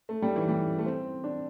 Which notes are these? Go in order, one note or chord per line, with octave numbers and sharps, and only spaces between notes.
A3
G3
E3
G3
A3
C4
D4